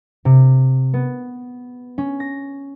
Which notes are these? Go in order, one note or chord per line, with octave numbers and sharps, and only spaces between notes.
C3
B3
C#4
A#6